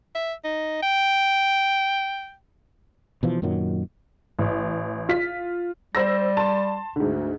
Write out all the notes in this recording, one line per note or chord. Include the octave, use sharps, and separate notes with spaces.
E5
D#4
G5
B2 E3 F3
F#2 A#2 D#3 F#3
A1
F4 B6
G3 C5 E6 A#6
A5 C6
D2 G#2 D3